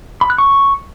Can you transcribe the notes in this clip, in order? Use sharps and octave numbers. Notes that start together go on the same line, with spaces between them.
B5
F#6
C#6